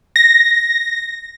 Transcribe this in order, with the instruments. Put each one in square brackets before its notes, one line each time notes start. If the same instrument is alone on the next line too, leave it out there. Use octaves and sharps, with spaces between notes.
[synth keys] A#6